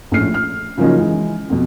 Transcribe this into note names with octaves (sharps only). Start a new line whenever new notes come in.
A#1 A2 C#4 F6 C7
F6
C#3 F3 F#3 A#3 C#4 D#4
E3 G#3
F2 B2